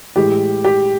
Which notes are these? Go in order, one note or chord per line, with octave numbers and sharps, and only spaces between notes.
A2 E3 G#3 G4
G4